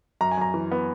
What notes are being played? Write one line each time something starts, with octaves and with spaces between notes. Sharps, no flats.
F#2 A#5
G#5
F#2 A#5
E3
B3